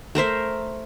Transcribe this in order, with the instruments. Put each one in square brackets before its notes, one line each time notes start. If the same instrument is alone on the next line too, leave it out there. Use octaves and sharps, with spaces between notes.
[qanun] A3 A#4 C5 E5